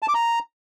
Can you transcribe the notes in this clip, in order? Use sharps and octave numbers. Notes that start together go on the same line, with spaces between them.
A5
D6
A#5